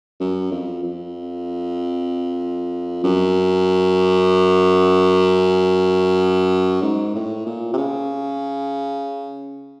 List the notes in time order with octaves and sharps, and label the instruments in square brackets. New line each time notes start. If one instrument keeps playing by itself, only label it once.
[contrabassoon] F#2
F2
F2
F#2
G#2
A2
A#2
C3
C#3